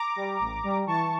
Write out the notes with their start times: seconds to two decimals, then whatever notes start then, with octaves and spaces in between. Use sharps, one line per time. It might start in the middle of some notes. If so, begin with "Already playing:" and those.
Already playing: A#5 D6
0.16 G3
0.40 A1
0.64 G3
0.87 E3 A5 C#6